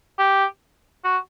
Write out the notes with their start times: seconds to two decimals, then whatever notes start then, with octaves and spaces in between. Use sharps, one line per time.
0.19 G4
1.04 F#4